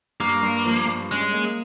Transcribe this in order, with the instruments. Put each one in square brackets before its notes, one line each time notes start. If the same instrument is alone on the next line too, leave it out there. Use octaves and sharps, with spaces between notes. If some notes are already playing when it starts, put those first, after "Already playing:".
[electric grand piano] G2 [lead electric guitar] A#3
[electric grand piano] G2
F3
G2
[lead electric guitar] G#3 [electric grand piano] C#4
[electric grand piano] A#3